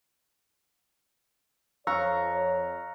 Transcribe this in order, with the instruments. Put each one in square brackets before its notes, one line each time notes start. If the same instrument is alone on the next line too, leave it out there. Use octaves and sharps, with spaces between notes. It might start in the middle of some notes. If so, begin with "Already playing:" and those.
[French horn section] F2 C#5 [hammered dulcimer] F5 [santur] A#5 C#6 [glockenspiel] E6 F#6 A#6